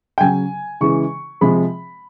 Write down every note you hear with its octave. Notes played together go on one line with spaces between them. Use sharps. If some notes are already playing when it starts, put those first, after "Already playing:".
G5
C#3 F#3 G#5
C#3 E3 G#3 C#6
C3 F3 G#3 B5